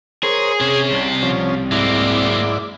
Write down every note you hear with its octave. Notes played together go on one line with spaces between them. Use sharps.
G#4 A#4 C5 C#5
C3 C#4 C5
C2
F3 C#4
G#2 F#3 A#3 E4 D5